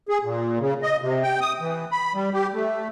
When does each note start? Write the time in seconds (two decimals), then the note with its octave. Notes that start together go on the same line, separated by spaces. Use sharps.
0.09 G#4
0.23 A#2
0.60 C#3
0.83 D#5
1.02 C3
1.23 G5
1.41 D#6
1.60 E3
1.92 B5
2.14 G3
2.33 G4
2.54 A3